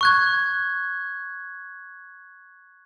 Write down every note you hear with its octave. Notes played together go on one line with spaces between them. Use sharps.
C#6 F#6 G#6